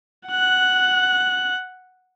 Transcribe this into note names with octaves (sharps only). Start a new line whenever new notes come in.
F#5 F#6